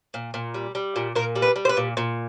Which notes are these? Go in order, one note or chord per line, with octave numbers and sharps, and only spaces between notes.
A#2
A#2
G3
G3
A#2
A#2 A#4
G3
B4
G3
C5
B4
A#2
A#2